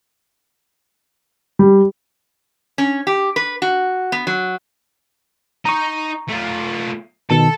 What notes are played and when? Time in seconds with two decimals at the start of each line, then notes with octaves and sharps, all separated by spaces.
1.59 G3
2.78 C#4
3.07 G4
3.36 B4
3.62 F#4
4.12 B3
4.27 F#3
5.65 D#4 D#5 A#5 C#6
6.29 A3 F4
7.30 B2 D#3 A4 A5